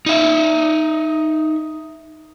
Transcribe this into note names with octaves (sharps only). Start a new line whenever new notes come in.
D#4 E5